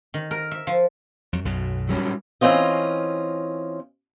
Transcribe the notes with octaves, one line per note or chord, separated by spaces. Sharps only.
D#3
A#4
E5
F3
F2 F#3
B1 F#2 B2
F#3 G3 C#4
E3 C4 C#4 F4 D#5